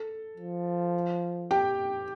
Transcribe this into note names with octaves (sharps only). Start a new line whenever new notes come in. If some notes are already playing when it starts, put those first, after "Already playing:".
Already playing: A4
F3
G4 G5